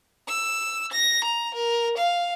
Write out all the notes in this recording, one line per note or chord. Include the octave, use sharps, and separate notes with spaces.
E6
A#6
A#5
A#4
F5